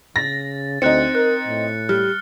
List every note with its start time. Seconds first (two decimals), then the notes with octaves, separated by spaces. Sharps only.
0.16 C#3 A6 A#6
0.82 D2 C4 D#4 F#6 A6 C#7
1.15 A#4 F#6
1.47 A2
1.89 G3 F6